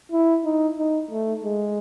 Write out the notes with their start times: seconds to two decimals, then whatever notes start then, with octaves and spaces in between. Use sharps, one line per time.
0.12 E4
0.45 D#4
0.78 D#4
1.11 A3
1.44 G#3